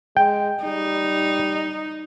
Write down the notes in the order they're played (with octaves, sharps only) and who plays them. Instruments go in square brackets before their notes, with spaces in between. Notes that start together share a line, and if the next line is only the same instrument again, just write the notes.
[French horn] G#3 [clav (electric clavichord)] G5
[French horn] G3 [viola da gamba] D#4